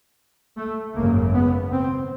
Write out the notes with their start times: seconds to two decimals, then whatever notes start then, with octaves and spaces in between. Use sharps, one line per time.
0.57 A3
0.95 G#1 F#2 C#3 A#3
1.34 B3
1.72 C4